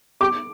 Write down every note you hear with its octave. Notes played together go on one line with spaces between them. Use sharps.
G4 D6